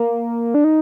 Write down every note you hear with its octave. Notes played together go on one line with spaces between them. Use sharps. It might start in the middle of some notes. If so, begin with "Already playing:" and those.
Already playing: A#3
D4
D#4